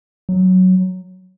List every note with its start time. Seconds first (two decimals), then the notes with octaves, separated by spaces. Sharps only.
0.29 F#3